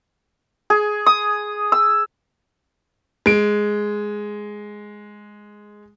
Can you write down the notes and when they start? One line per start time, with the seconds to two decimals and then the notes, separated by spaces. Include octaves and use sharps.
0.70 G#4
1.06 D#6
1.72 E6
3.26 G#3 D7